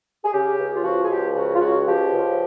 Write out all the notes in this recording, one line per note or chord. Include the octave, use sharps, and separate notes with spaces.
G#4
C#3 G4
C#2
F4
F3 F#4
G#4
C#2 G4
C#3 F#4
F4
C#2 F#4
F3 G4
C#2